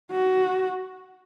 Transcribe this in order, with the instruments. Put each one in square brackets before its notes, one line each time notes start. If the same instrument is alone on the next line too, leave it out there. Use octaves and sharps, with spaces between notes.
[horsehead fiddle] F#4